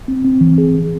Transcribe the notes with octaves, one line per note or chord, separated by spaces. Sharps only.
C4
C4
E3
G#4
E3